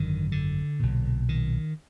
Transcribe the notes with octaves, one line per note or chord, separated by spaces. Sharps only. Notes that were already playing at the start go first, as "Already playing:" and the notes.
Already playing: G#1 F#2 D3 D#3
D3
B1 A#2
D#3